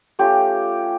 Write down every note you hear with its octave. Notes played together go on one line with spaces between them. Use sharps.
A3 C#4 F4 G4